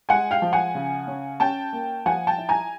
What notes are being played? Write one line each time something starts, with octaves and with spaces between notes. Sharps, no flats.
G#3 F#5 G#5
F5 G5
F3
F#5 G#5
C#3
C#4
C#4 G5 A5
A#3
F3 F#5 G#5
G5 A5
E4
G#5 A#5